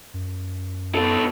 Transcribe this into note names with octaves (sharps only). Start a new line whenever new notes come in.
F#2
B2 A4